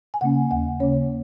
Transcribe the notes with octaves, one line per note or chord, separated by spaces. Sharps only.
G#5
C#3 A#3 C#4 F#5
D#2 F#5
C#3 A#3 C#4 C#5